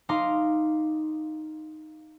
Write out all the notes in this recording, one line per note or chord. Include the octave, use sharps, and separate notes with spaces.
D#4 F5 A#5 C6 D6